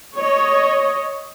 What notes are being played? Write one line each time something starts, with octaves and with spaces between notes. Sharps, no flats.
C#5 D#5